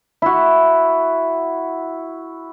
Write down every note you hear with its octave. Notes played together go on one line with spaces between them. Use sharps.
E4 F#4